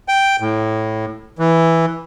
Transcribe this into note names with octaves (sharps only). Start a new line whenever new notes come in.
G5
A2
E3